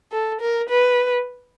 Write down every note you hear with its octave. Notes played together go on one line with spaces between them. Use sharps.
A4
A#4
B4